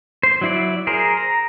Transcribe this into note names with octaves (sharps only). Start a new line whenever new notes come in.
C5
F#3 E4 D5
G#4 A#4 C5
A#5